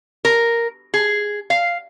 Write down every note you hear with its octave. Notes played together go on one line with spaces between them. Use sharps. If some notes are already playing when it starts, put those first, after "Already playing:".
A#4
G#4
F5